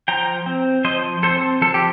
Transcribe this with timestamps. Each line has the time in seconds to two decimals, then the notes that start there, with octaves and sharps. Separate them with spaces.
0.08 F3 G5 A#5
0.46 C4
0.84 F3 C5 D#5
1.23 C4 A4 C5
1.62 F3 A4
1.74 G4